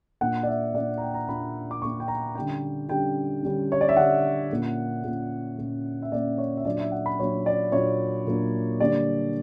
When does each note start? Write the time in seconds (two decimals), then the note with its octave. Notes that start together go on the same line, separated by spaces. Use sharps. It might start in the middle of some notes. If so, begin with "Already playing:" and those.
0.21 A#2 A#3 D4 F#5
0.43 D5
0.47 E5
0.74 A#2 A#3 D4 D5
0.98 A#5
1.01 G5
1.14 A#5
1.28 A#2 A#3 D4 B5
1.71 D6
1.82 A#2 A#3 D4 C#6
2.00 G5
2.08 A#5
2.35 D3 G3 C#4 G5
2.89 D3 G3 C#4 G5
3.43 D3 G3 C#4
3.72 C#5
3.81 D5
3.89 E5
3.97 D3 G3 C#4 F#5
4.51 A#2 A#3 C#4
5.04 A#2 A#3 C#4
5.59 A#2 A#3 C#4
6.02 E5
6.12 A#2 A#3 C#4 D5
6.38 C#5
6.57 E5
6.65 A#2 F#3 A#3 D4 D5
6.78 E5
6.92 F#5
7.06 B5
7.19 A#2 F#3 A#3 D4 C#5
7.46 D5
7.72 A#2 F#3 A#3 D4 C#5
8.27 A#2 F#3 A#3 D4
8.80 D3 G3 A#3 D4 D5